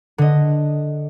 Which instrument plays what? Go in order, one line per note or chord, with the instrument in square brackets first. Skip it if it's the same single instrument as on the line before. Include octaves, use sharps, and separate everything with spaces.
[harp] D3 D#5